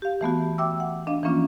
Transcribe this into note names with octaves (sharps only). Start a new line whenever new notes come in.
G4 F5
E3 A3 B3 F#4
E5 G5 D6 E6
F#5
D4 D#5 F5
E3 F3 A#3 C#4 D4 F4